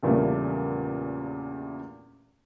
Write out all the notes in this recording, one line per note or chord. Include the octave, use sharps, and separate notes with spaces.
A#1 E2 A#2 C#3 G3 A3